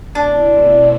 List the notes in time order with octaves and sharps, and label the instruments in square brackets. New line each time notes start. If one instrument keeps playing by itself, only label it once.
[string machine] B2 A3 C4 E4 [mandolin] D4